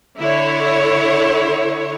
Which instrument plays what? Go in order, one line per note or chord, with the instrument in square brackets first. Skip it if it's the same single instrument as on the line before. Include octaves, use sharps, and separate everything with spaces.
[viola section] D3 E4 C#5